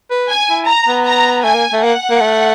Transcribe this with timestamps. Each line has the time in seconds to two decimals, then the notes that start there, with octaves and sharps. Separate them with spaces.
0.10 B4
0.30 G#5
0.50 E4
0.67 A#5
0.88 B3
1.06 A#5
1.44 A3 G#5
1.54 A#3
1.73 A3
1.82 A#3 F#5
2.10 A#3
2.21 A3